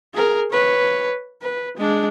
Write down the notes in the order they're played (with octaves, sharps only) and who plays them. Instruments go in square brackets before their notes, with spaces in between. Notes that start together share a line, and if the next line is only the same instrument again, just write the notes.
[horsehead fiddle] G#4 A#4
B4 C#5
B4
G#3 D4